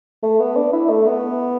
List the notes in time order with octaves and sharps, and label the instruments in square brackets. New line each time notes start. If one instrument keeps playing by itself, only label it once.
[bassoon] A3
B3
D4
E4
A3
B3